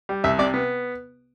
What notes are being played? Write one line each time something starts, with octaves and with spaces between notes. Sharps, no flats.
G3
C2 E5
C3 D5
B3